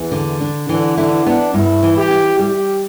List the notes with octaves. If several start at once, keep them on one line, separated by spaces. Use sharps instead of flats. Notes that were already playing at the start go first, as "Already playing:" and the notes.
Already playing: E2 E3
D3
D4
D3 E3
D3 E4
B3 D4
G2 E4
E3
G4
E4
G3 G4